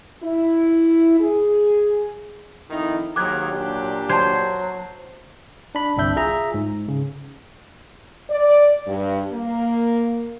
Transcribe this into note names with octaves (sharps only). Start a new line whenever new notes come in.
E4
G#4
F2 D#3 D#4 E4
D#2 G#2 D#3 F#3 D6 F#6 G#6
A#2 D4 G4
F#3 C5 A5 G#6
D4 B5
G1 C2 C4 D4 E5 G6
F4 G#4 E5 A#5
G#2
C#3
D5
G2
A#3